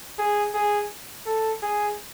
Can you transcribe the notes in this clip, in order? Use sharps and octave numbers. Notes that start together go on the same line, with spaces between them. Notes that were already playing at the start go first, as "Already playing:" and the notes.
G#4
G#4
A4
G#4